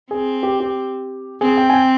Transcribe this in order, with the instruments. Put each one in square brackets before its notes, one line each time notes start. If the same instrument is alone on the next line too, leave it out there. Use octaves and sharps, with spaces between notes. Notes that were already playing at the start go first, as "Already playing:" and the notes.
[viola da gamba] C4 [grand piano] G#4
[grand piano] G4
G4
[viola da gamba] C4 [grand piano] G#4
[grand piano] G5
G#5
G5